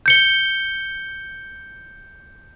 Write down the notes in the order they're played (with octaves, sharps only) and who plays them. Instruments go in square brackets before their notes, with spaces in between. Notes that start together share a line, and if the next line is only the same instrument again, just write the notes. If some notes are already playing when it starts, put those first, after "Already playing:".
[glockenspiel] G6 C#7 G7